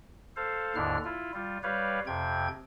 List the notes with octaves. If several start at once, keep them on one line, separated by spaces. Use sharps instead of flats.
A4 C5 F5
D#2 G#2 D3 D4 E4 F6
E4 F4
G3 F4
G3 G4 B4 C#5 F5
F2 C3 G5 G#6